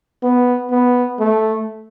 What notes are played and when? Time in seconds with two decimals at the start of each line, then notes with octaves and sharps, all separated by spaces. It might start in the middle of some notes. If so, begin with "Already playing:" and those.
0.23 B3
0.71 B3
1.19 A3